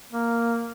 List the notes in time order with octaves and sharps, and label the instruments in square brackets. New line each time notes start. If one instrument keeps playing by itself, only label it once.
[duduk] A#3